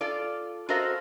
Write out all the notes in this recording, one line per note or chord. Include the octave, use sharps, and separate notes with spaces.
F4 A4 D5
F#4 A4 A#4 C5 D#5 F5